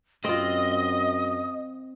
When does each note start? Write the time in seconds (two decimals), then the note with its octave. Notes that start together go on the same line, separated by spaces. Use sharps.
0.25 F#2 C4 F4 D#5 D#6